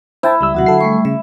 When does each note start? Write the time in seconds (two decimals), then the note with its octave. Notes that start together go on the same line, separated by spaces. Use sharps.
0.23 E4 C5 G5 A5
0.41 C#2 G3 E5 E6
0.54 D#2 C3 F#3 F#4 F#5
0.66 D3 A4 E5 C7
0.81 G3 A3 C#6
1.05 C#3 E5